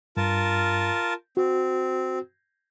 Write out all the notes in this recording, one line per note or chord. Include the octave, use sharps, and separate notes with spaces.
G2 F4 A#4 A5
C4 F#4